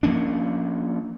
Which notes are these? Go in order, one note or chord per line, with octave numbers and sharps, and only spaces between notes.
F3 A#3 C#4 D4